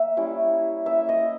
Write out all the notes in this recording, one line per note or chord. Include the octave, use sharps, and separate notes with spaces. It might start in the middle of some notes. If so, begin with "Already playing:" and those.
Already playing: A#3 E5
G3 C#4 E4
A#3 C#4 E4 E5
D#5